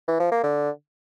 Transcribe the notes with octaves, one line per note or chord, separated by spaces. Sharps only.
E3
F3
A#3
D3